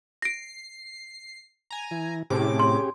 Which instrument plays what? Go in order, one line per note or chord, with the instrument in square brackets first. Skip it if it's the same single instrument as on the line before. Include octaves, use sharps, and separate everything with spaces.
[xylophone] A#6 D7 [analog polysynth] C7
[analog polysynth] G#5 A#5
[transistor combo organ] E3
[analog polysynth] A2 C3 D6 [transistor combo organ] C#4 G4 G#4
[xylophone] C6